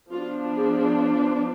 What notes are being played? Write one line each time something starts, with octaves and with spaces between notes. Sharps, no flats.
F3 B3 D4 F4
G#4